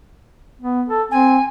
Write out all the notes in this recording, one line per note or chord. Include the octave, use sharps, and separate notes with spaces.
B3
A4
C4 G#5